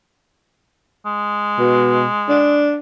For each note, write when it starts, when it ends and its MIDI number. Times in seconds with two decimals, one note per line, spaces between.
1.06 2.70 56
1.59 2.06 47
2.29 2.79 62